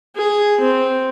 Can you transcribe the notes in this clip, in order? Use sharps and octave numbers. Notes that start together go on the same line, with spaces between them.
G#4
C4